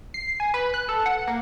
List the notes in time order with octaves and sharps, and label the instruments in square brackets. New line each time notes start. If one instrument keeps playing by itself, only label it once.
[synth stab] C7
G#5
B4
F#6
A4
F#5
A#3